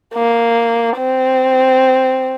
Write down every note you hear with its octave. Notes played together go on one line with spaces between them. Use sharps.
A#3
C4